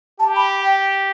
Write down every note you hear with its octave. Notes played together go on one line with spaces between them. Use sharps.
G4 A5
B5
G5